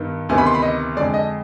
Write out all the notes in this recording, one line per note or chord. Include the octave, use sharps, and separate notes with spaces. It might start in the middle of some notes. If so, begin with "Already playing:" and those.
Already playing: G2 D#3 B3
D2 C3 D#3 B3 G#5
B5
C6
B5
D#5
F2 D3 G#3 D5
D#5